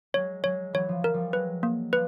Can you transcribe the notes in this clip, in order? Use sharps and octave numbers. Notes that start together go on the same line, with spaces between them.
F#3 G#3 C#5
F#3 G#3 C#5
E3 F#3 C#5
F3
F#3 A#4
F3 G3
F#3 G#3 B4
A#3
F3 G3 B4